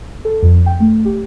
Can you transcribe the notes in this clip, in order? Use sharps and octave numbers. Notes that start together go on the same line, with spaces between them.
A4
F2
G5
A3
G4